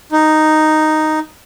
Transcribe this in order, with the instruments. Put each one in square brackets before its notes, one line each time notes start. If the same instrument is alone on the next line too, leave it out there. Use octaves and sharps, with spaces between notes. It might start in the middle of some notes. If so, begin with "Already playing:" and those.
[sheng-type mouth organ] D#4